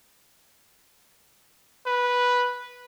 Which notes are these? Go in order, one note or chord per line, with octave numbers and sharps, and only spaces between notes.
B4